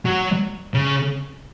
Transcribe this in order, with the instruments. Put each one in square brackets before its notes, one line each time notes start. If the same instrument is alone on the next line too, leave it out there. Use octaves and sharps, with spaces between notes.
[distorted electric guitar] F#3
C#3